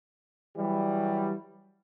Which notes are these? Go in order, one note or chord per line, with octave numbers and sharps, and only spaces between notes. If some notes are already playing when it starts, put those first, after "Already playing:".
E3 F#3 G3